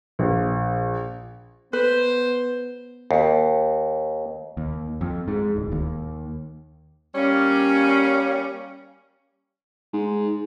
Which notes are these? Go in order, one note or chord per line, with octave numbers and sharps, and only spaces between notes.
A#1
B3 B4 C5
D#2
D#2
F2
G#2
D1
D#2
G3 A#3 C#4
G#2